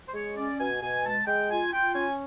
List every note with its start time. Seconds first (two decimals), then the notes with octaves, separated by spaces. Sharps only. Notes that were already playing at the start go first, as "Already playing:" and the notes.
0.09 C5
0.14 G#3 C#5
0.36 C#4 D5
0.60 B2 G#5
0.82 B2 G#5
1.05 G#3 A5
1.27 G#3 G5
1.50 F4 G#5
1.73 F4 G5
1.95 C#4 G#5